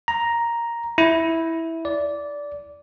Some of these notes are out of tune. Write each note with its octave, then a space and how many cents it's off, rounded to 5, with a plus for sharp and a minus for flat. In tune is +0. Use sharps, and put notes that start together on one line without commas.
A#5 +5
E4 -10
D5 -15